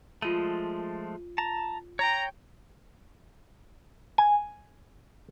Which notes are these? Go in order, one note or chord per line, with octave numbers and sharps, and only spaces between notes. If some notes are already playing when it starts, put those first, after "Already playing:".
F3 G#3 A3 F4 D#7
A5 A#5
C#5 G5 A#5
G#5